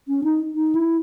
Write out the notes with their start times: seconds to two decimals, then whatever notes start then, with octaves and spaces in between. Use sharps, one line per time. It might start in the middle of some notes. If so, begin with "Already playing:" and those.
0.08 C#4
0.24 D#4
0.54 D#4
0.75 E4